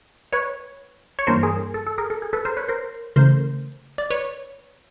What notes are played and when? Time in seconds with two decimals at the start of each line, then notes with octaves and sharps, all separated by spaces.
0.32 B4 C#5
1.19 C#5
1.27 G2 E3 G3 A#3 D4 A#4 C5
1.43 G#4 A#4
1.74 A4
1.87 A4
1.98 G#4 A#4
2.10 A4
2.22 G#4
2.33 A4 B4
2.45 A#4 C5
2.57 B4 C#5
2.68 A#4 C5
3.16 C#3 E3 A3 A#4 C5
3.98 D5
4.10 B4 C#5